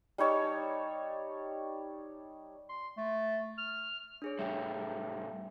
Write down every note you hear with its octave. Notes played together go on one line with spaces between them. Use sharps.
G3 D#4 C#5 A5
C6
A3
F6
D4 G#4 C#5
A2 G3 E5 G5